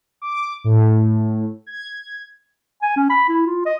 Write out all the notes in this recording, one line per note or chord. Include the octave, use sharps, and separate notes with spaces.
D6
A2
G#6
G#5
C#4
B5
E4
F4
D#5